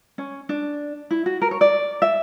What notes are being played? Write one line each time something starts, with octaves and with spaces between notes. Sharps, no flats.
C#4
D4
E4
F#4
A#4
C#5
D5
E5